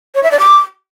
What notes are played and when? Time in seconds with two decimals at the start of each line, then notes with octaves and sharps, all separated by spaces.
0.15 C#5
0.23 E5
0.31 D5
0.39 D6